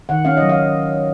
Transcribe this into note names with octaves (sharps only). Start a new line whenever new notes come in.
D#3 F#5
C#4 F5
D#5
F#3
F5